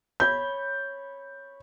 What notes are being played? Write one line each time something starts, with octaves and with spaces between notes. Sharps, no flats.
C#5 B5 G6